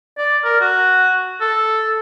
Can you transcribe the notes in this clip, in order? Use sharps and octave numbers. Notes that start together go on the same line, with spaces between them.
D5
A#4
F#4
A4